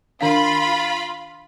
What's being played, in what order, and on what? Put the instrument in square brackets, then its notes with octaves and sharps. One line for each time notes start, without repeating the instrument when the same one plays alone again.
[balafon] D#3 D4 F5 [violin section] F4 B5